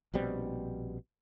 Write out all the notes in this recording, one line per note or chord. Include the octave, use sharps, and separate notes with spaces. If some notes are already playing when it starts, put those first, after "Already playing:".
A#1 B2 G3 C4